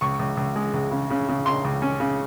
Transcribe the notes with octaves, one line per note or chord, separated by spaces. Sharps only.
C#2 C#6
C#2
C#2
G#3
C#2
C#3
C#3
C#3
C#3 C6
C#2
C#4
C#3